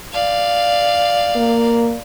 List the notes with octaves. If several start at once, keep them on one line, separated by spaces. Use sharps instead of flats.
D5 F5
A#3